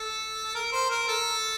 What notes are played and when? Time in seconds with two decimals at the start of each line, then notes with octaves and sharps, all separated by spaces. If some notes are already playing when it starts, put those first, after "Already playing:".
Already playing: A4
0.55 A#4
0.72 C5
0.90 A#4
1.08 A4